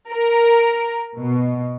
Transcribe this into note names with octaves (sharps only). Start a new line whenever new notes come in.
A#4
B2